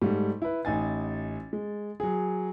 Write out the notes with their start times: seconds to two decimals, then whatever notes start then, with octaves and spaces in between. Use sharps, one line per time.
0.02 G#2 G3 A3
0.42 E4 B4
0.65 A1 D#4 G#5 A6
1.53 G#3
2.00 F#3 G#4